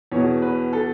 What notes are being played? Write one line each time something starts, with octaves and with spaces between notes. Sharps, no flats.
E2 B2 C#5
B4
A4